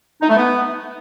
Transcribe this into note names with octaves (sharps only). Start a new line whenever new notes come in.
D#4
A3
B3